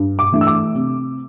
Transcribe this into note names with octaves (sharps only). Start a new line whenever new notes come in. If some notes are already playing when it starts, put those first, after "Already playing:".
Already playing: G2
D6
E3 A3 D4
E6
D6
C3